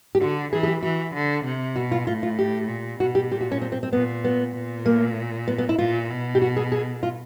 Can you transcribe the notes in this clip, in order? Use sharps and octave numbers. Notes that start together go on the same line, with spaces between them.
G4
D3 F#4
E3 G#4
G#4
G4
E3 F#4
D3
C3
B2 F#4
F4
A2 F4
F4
G4
A#2
B2 F#4
G4
A#2 G4
F#4
C#4
C4
C4
C4
A#2 B3
B3
A#2
A#3
B3
B3
E4
A#2 F4
B2
G4
F#4
G#4
G#4
F4